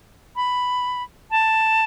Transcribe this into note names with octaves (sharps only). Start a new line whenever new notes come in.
B5
A5